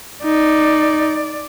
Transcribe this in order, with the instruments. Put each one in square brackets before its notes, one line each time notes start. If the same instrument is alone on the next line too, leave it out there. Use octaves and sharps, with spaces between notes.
[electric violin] D#4 [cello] D5